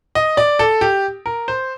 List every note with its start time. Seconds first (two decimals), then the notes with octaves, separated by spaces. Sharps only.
0.15 D#5
0.37 D5
0.59 A4
0.81 G4
1.26 A#4
1.48 C5